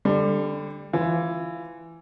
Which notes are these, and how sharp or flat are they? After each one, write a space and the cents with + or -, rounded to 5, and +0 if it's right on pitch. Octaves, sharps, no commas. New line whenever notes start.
D3 +0 G3 +20
E3 +15 F4 +0